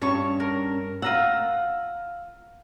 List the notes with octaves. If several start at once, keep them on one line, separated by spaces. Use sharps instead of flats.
G2 C#4 C#5 A5 C#6
A#4
F4 F#5 A#5 E6